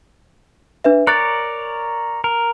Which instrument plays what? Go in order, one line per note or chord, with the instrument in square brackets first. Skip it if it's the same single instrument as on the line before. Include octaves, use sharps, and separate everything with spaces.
[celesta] D4 B4 E5
[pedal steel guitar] A#4 C#5 D5 [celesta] F#6 A6
[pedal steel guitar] A#4